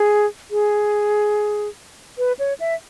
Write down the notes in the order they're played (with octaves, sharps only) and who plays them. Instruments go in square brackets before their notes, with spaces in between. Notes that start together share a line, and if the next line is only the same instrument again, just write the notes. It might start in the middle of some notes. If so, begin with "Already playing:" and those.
Already playing: [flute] G#4
G#4
B4
C#5
E5